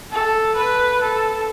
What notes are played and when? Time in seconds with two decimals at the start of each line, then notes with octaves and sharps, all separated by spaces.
0.12 A4
0.56 B4
1.02 A4